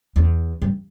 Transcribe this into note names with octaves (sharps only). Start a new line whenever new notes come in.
E2
G2